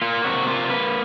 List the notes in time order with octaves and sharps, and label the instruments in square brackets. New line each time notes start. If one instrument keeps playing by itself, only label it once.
[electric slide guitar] A#3 F4
C3 F#4
A#3 F4
A#3 B4